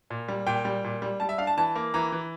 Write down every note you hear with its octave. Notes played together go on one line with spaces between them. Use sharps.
A#2
G3
A#2 G5
G3
A#2
G3
G3 A5
E5
D4 F5
A5
E3 A5
A#3
E3 A#5
E3